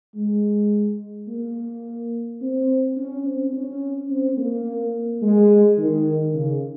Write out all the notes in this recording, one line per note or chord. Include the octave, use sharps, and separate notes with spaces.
G#3
A#3
C4
C#4
C4
C#4
C4
A#3
G#3
D#3
C#3